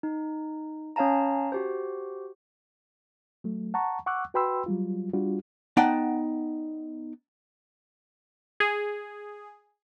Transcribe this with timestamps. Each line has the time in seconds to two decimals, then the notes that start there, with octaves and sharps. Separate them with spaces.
0.03 D#4
0.96 C#4 C#5 F5 A5 A#5
1.52 F#4 G4 C5
3.44 F#3 A3
3.74 F#5 A5 A#5 C#6
4.06 F#5 C#6 D6 E6 F#6
4.34 F#4 B4 G5 B5 C6 E6
4.66 F#3 G3 F4
5.13 G3 D4 F4 F#4
5.77 B3 D#4 D5 F#5 G5 A5
8.60 G#4